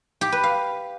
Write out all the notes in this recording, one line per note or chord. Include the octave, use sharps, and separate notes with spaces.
G4
B4
F5